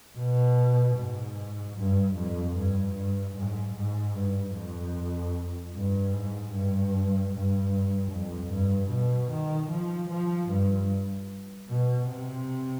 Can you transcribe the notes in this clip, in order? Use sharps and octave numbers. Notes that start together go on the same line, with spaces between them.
B2
G#2
G2
F2
G2
G2
G#2
G#2
G2
F2
G2
G#2
G2
G2
F2
G2
B2
D#3
F3
F3
G2
B2
C3